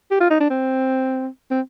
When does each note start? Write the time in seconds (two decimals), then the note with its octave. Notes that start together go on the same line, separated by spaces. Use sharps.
0.11 G4
0.21 F4
0.30 D#4
0.40 D4
0.50 C4
1.51 C4